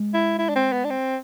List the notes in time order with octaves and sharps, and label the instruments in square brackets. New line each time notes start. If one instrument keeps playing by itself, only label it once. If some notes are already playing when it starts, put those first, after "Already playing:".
Already playing: [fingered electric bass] G#3
[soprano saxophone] E4
E4
D4
C4
B3
D4
C4